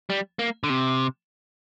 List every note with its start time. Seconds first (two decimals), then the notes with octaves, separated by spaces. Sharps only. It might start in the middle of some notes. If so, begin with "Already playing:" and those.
0.10 G3
0.39 A#3
0.63 D3
0.70 C3